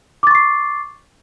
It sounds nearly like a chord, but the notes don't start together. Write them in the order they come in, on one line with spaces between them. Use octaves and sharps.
D6 A6 C#6 C7